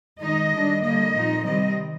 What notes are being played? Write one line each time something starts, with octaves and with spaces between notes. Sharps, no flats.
D#3 G#3 D#4 D#5
D#3 G3 D4
D3 G3 A#3 D#5
A#2 F3 C4 D#4
C3 D#3 G3 C4 D#5